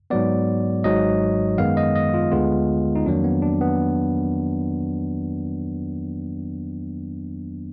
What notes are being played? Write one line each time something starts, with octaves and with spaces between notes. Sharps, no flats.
G#2 F#3 B3 D5
G#1 G#2 F#3 D#5
F#2 D#3 G#3 B3 F5
D#5
D#5
F4
D2 D3 G#3 B3 F4
D#4
F2 D#3 F#3 A#3 D4
B3
D4
B3